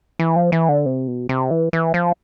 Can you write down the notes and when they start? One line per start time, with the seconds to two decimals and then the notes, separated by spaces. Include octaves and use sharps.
0.19 E3
0.36 F3
0.52 E3
0.69 D3
0.86 C3
1.08 B2
1.29 C3
1.51 E3
1.73 E3
1.94 F3